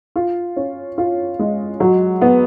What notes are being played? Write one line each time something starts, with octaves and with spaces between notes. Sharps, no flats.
F4
C#4
F4
G#3
F#3
B3